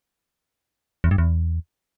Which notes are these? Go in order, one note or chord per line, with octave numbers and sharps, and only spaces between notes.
E2
G2
E2